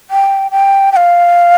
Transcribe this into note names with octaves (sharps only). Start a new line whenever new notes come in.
G5
G5
G5
F5